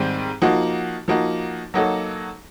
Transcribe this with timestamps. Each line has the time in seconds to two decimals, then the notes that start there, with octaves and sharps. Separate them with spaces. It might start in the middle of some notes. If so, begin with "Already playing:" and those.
Already playing: G#2 D#3 G3 C4
0.42 F3 A#3 D#4 F#4
1.08 F3 A#3 D#4 F#4
1.74 F#3 A#3 D#4 F#4 A4